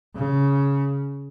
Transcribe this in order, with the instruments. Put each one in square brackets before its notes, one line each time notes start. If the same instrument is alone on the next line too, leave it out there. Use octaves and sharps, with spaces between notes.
[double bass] C#3